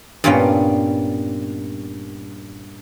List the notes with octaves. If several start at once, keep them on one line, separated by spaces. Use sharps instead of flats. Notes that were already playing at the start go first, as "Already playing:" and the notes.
G2 A#2 A#3 B3 C#4 G5